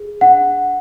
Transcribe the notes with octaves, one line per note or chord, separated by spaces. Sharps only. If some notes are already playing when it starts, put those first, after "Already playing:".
Already playing: G#4
D4 F#5